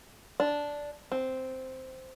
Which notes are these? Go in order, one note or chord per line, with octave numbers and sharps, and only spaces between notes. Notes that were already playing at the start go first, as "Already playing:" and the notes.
D4
C4